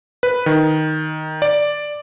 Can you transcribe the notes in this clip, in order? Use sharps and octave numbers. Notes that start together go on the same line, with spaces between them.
B4
D#3
D5